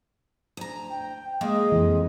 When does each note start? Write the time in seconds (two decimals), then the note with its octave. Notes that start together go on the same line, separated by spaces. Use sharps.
0.57 D2 A#5
0.90 G5
1.41 G#3 A#3 G#4 D#5
1.72 F2 E3